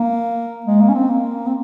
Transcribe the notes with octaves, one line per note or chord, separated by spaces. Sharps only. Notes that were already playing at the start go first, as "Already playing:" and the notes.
Already playing: A#3
G#3
A#3
C#4
C4
A#3
C4